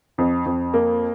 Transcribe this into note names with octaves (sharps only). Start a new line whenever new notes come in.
F2
F2
A#3